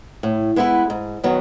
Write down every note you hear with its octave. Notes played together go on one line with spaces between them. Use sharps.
A2
G#3 B3 E4 B4
G#2
D#3 F#3 B3